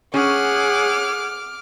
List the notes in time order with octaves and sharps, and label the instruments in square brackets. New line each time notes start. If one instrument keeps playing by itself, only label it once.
[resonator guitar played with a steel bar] C#4 [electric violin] G#4 F#5 [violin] D6 F6